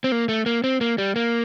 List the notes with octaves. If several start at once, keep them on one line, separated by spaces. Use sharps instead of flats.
C4
A#3
A3
A#3
C4
A#3
G3
A#3